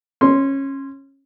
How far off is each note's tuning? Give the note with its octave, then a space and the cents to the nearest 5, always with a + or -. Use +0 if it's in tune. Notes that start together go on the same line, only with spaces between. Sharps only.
C#4 -20 C6 +0